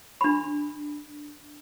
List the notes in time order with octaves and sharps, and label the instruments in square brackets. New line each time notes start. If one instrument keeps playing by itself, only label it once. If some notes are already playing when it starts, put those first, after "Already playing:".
[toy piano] D4 B5